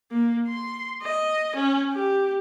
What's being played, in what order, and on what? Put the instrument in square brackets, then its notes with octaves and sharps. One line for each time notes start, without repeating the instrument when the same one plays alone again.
[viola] A#3
C6
D#5
C#4
G4